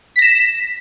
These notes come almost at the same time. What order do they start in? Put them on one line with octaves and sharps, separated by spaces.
B6 A#6 E7